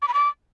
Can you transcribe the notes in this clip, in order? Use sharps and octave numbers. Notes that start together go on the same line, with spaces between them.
D6
B5
D6